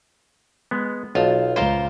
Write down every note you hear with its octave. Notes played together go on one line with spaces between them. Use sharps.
G#3 B3
B1 F4 A5
C#2 F4 A#4 C5